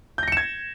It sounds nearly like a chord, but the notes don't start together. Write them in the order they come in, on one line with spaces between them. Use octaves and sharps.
G6 A#6 C#7 E7 G#6